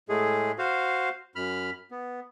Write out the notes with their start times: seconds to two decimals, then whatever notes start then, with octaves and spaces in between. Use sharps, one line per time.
0.09 A2 G#3 A3 G#4
0.58 F#4 C5 F5
1.36 F#2 B5 F6
1.91 B3